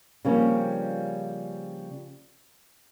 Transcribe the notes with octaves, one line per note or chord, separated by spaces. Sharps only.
C#3 F3 G3 A#3 C4 C#4